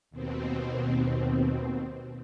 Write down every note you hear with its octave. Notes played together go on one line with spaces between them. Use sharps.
D#2 B2 C4